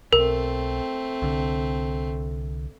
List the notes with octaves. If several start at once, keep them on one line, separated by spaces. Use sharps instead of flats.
B1 A3 C4 A#4
C2 D3